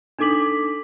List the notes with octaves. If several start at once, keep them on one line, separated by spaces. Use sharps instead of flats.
D4 D#4 A4 D6 B6 F#7